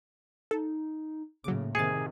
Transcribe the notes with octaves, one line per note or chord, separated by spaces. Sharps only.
D#4 A4
A2 C#3 F#3 A#3 D6
C3 D#3 G#4 A6 C#7